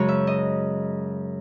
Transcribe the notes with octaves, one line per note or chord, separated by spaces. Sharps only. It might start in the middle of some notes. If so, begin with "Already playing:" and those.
Already playing: F#2 C#3 G#3 C#5
E5
D#5